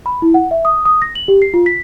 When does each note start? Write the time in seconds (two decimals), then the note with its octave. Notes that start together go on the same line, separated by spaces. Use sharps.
0.06 B5
0.22 E4
0.34 F#5
0.51 E5
0.65 D#6
0.85 D#6
1.02 A#6
1.15 F#7
1.28 G4
1.42 C7
1.54 F4
1.66 B6